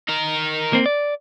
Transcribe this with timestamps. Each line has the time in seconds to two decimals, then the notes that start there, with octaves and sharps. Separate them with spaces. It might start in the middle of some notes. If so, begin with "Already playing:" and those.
0.09 D#4 A#4
0.73 A#3 C4
0.86 D5